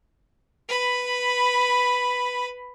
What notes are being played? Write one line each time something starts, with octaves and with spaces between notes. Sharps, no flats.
B4 B5